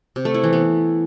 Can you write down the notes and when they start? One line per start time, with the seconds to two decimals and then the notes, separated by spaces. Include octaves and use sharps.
0.16 C3
0.25 A3
0.34 E4
0.44 E3
0.53 B3